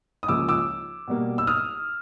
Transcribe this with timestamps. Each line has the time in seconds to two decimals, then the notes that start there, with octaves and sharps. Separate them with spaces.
0.23 D#6
0.28 C#2 C#3 F3 A#3 C#4 D6 E6
0.48 D6 E6
1.08 B2 G3 A#3
1.38 E6
1.47 D#6 F6